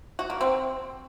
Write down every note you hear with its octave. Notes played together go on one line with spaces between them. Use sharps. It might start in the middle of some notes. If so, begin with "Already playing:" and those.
F#4
A#3
C4